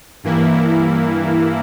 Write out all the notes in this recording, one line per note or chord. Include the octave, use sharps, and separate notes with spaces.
G2 E3 A#3 E4